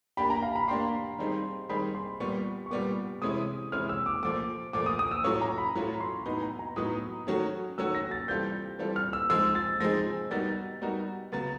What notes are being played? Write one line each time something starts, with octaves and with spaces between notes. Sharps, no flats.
A#3 D4 G4 B5
A#5
F5
B5
A#3 D4 G4 C6
D#3 G3 C4 D#4 G#4
D#3 G3 C4 D#4 G#4 B5
C6
A#2 G3 B3 C#6
C#6
A#2 G3 B3 D6
C3 E3 G#3 C#4 E4 D#6
C3 E3 G#3 C#4 E4 F6
E6
D6
A#2 F3 A3 D6
A#2 F3 A3 D6
D#6
D#6
E6
A2 F#3 A3 C#4 F4 C#6
A#5
B5
A2 F#3 A3 C#4 F4
C6
A2 F#3 B3 D#4 B5
A#5
A#5
A2 F#3 B3 D#4 D#6
D#3 F#3 A3 C#4 F#4
D#3 F#3 A3 C#4 F#4 E6
A#6
A6
E3 G3 C4 F4 A4 G6
E3 G3 C4 F4 A4
F6
E6
F3 G#3 C4 D#4 G#4 E6
A6
F3 G#3 C4 D#4 G#4 A#6
G3 B3 D#4 F#4 A#4 A6
G3 B3 D#4 F#4 A#4
C#3 F#3 B3 A6